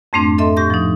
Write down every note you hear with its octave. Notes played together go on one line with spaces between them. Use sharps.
F2 G#2 A3 C4 D4
A4 D#5 E5 C6
A2 G4 G6 A#6
F3 D#4